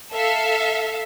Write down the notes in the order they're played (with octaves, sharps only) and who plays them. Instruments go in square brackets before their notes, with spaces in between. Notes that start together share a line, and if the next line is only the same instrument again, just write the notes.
[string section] A4 E5 F5